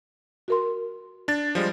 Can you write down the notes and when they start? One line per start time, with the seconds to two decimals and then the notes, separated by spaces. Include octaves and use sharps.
0.48 F#4 A#4 C6
1.28 D4 A6
1.55 F3 G3 G#3